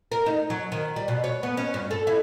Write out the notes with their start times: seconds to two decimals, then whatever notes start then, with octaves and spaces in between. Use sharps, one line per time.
0.12 A#4
0.26 D#4
0.50 F#3
0.72 D#3
0.96 G3
1.08 B2
1.24 C#5
1.43 B3
1.57 C#4
1.74 G2
1.91 A4
2.07 E4